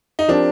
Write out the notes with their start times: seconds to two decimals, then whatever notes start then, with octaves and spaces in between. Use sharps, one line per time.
0.19 D#4
0.28 F3 C4 D4 G4 A#4